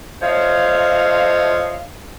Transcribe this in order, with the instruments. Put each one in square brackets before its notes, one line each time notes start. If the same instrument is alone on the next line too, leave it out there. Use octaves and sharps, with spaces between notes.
[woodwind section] A3 F4 C5 C#5 D#5 F5